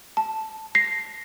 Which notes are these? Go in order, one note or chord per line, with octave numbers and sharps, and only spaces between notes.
A5
A#6 C7